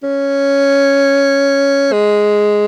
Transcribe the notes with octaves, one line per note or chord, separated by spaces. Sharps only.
C#4
G#3